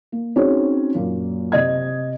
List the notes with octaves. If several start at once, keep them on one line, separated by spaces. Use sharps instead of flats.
A#3
C4 C#4 D#4 F#4 G#4 C#5
F#2 A#2 A#3
C3 D#5 G#6